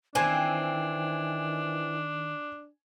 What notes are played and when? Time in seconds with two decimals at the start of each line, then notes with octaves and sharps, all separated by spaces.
0.15 D#3 E3 C4 D4 G#5